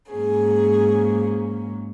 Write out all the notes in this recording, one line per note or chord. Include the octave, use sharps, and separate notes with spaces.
G#2 F#3 A#3 C#4 G#4